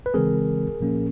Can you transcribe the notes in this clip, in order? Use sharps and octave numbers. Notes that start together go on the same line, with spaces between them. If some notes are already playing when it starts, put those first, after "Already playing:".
B4
C#3 E3 G#3 C4 G#4 A#4
A#2 F3 A#3 C#4